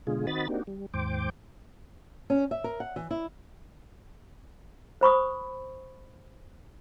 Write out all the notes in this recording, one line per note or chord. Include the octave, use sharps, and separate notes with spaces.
B2 D3 G#3 F4 G#4
D#3 C4 F#4 D#5 B5 A6
A#3 C4 D4 D#4 F#4 G4
G3
D#2 G#2 C5 G5 D6
C#4
E5
A#4
F#5
E3
E4
C5 B5 C#6 D#6